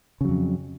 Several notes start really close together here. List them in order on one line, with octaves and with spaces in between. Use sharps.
C#3 F#3 F2